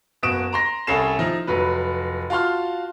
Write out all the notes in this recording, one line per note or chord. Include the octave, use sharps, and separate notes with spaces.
F#1 B2 F#4 D#6 D7 E7
A#5 C6 A#6
C2 C#4 A4 C7 E7
F3 D#4 E4
F1 F#3 B4
F4 F#4 A5 C6 F6